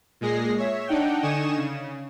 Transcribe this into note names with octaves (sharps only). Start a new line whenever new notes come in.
A#2 G#3 G#4 A#6 C7
C#5 E5
D4 D#4 F#5 G5
D3 D#4 G#5 C#6 D#6 E7
C#3